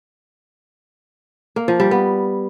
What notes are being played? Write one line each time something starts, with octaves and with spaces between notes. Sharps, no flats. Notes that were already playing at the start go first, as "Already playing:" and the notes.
A#3
F3
G3
B3